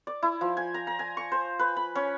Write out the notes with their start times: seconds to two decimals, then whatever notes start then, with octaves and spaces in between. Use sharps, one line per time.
0.07 D5
0.23 E4
0.41 F3
0.57 G#5
0.74 A#5
0.87 A#5
0.99 G#5
1.17 C#6
1.32 C5
1.59 B4
1.77 B5
1.95 C#4